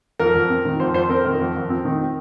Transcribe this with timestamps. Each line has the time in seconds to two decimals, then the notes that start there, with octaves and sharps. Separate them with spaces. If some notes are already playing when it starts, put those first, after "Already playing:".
0.20 F2 A#4
0.35 F2
0.50 C4
0.65 D#3
0.80 F2 C5
0.94 F2 C5
1.09 C4 A#4
1.24 D#3 A#4
1.40 F2
1.55 F2
1.70 C4
1.85 D#3